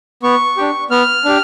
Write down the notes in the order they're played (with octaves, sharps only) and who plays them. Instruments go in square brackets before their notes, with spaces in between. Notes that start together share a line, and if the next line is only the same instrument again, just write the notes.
[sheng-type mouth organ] B3 C#6
D4 G4
B3 F6
D4 G4